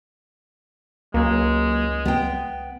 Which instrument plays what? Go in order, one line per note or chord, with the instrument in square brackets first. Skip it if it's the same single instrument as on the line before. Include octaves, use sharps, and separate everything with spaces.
[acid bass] C#2 [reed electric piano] F#3 A#3 [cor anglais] G#3
[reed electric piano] C2 [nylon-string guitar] B3 G5